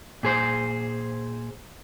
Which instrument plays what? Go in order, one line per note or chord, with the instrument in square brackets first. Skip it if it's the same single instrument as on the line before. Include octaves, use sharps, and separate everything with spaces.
[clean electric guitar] A#2 G#4 C5